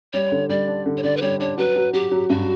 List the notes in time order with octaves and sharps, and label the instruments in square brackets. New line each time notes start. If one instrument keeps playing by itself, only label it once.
[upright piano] G3 [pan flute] C#5
[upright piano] D3
[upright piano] G3 [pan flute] D5
[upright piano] D4
D3
[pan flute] C#5
[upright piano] D3 [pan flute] D5
[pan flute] B4
[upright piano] G3 [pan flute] C#5
[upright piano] D4 [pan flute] C#5
[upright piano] F#3 [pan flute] B4
[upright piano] F#3
[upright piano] F#3 [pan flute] G4
[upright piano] F#3
[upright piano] G2 [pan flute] F#4